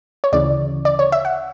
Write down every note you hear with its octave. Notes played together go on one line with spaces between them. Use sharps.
C#5
D2 C#3 E3 D5
D5
C#5
E5
F#5